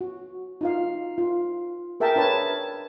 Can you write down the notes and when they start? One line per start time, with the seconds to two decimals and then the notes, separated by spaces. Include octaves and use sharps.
0.01 F#4
0.61 D#4 F4 F5
1.18 F4
2.00 G#4 A#4 E5 G5 A5
2.16 D4 A#4 B4 C#5 A5